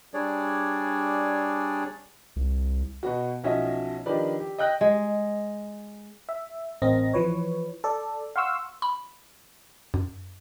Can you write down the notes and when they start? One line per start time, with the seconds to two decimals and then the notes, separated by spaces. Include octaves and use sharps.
0.14 G3 D4 G#4 C#5 D5
2.36 C2
3.03 B2 B3 F#4
3.44 B1 F3 C#4 F#4 D#5 E5
4.06 D#3 F3 D4 G4 B4 D5
4.40 G4
4.58 D#5 G5 F#6 A#6
4.81 G#3
6.29 E5
6.82 A1 C4 A#4 D#5 A#6
7.13 E3 F3 B4 C#5
7.84 A4 D5
8.36 F5 F#5 C6 C#6 E6
8.82 B5
9.94 F#2